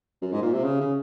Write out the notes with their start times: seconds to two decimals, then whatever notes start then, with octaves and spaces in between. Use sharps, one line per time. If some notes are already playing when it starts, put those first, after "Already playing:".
0.22 F#2
0.32 G#2
0.42 A#2
0.53 C3
0.64 C#3
0.81 C#3